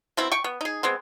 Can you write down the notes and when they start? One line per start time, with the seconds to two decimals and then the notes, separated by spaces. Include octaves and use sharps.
0.17 B2 C4 E4
0.32 G5 C#6
0.44 B3
0.61 D#4 G#4
0.83 G#3 B3 C4